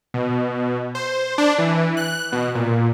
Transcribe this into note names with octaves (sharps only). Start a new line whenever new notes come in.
B2
C5
D4
E3
F#6
B2
A#2